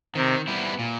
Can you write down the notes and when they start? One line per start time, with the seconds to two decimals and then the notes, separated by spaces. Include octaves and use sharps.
0.15 C3 D#3
0.48 G3 B3 E4
0.79 A#2